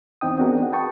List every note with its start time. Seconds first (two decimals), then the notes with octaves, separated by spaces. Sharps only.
0.21 E2 E3 C4 D#4 G5 D#6
0.38 B3 C4 D4 F#4 G#4 A#4
0.59 D#4 F#5
0.72 G#4 B4 G5 A5 C#6 D#6